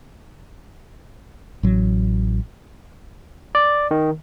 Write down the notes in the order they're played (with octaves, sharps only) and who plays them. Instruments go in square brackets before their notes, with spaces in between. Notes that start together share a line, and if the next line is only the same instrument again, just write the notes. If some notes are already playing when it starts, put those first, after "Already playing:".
[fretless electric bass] A1 F#3
[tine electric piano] D5
D#3